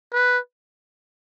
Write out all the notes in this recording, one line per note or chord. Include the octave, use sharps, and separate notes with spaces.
B4